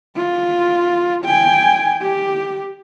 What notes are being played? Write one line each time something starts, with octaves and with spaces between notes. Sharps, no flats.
F4
G5 G#5
G4